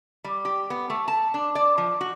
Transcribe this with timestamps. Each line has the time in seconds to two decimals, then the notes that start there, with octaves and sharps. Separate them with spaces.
0.24 G3
0.45 G4
0.70 B3
0.90 A3
1.08 A5
1.34 D4
1.55 D5
1.78 F3
2.01 F#4